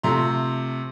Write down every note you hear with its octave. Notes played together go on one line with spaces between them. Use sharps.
C3 F3 A3 A#5 C6